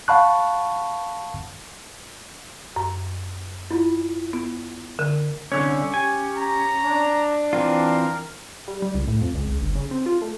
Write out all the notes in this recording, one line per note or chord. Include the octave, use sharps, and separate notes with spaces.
F5 F#5 A5 B5 C#6 F#6
F#2
E4 F4
B3
D3 A#4
C2 D3 C#4 C#5
G4 G#5
A#5
D4
E3 C4 F4 A#4
G3
G3
C#2
A2
F2
C#2
C#2
G1
C#3
C4
F4
A3